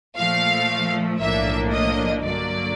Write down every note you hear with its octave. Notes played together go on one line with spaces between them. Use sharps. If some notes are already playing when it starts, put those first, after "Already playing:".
A#2 F3 A3 F5
B1 A2 F3 A#3 D4 E5
D#5
G2 D3 F#3 A#3 D5